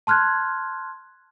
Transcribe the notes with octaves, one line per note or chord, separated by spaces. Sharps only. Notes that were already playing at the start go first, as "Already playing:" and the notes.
A5 C6 F6 F#6 G#6